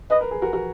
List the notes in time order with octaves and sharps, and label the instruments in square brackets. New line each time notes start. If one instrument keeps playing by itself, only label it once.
[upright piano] B4 [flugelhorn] D#5
[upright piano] A#4
G#4
F#4 A#4
F#4 A#4